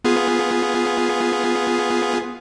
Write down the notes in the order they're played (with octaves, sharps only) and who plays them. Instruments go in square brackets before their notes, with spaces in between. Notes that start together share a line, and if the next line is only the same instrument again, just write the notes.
[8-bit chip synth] B3 F4 G#4